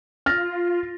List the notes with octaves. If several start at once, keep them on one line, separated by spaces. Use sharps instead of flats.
F4 F6 A6 A#6